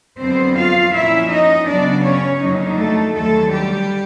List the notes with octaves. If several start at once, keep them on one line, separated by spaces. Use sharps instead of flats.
F2 D3 F#3 B3 C4 C5
F4 F5
A#2 F3 A#3 C#4 E4 E5
D#4 D#5
C#3 F#3 B3 D4 D5
C#4 C#5
F2 D3 F#3 A#3 D#4
A3 A4
D#2 D3 F#3 A3 A4
G3 G4